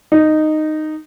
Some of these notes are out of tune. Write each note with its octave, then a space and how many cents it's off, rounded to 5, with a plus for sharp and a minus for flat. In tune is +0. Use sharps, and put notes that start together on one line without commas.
D#4 -10